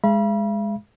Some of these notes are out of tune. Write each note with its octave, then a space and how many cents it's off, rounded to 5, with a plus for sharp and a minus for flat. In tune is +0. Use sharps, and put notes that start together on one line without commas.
G#3 +0 F5 -45 B5 -35